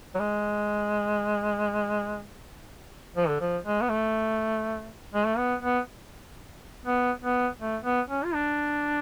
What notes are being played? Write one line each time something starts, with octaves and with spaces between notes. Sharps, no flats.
F#3
G#3
F3
D3
F3
G#3
B3
A3
G#3
A3
B3
B3
B3
B3
A3
B3
C#4
F4
D4